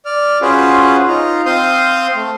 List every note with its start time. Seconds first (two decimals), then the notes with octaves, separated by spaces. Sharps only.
0.06 D5 F6
0.42 C#4 F4 F#4 G#4 B4 C5
1.08 D#4 F4 A#5
1.46 C4 C5 F5 C6 D#6 G6
2.16 A3